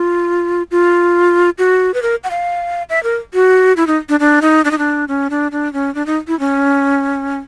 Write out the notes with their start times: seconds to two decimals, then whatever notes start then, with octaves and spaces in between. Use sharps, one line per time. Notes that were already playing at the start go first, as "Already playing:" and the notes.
Already playing: F4
0.71 F4
1.58 F#4
1.94 B4
2.02 A#4
2.24 F#5
2.31 F5
2.90 E5
3.03 A#4
3.34 F#4
3.77 E4
3.87 D#4
4.09 D4
4.20 D4
4.42 D#4
4.65 D4
4.71 D#4
4.78 D4
5.08 C#4
5.30 D4
5.52 D4
5.73 C#4
5.95 D4
6.07 D#4
6.28 E4
6.39 C#4